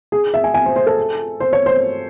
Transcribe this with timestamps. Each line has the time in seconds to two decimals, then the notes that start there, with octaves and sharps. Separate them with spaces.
0.12 G#4
0.34 E5
0.44 G#5
0.54 G#5
0.66 C5
0.76 C5
0.86 A4
1.40 C5
1.53 C#5
1.66 C5